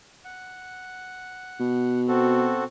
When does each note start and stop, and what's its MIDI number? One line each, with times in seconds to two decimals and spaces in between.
0.25 2.00 78
1.60 2.66 47
2.08 2.64 60
2.08 2.64 66
2.08 2.64 69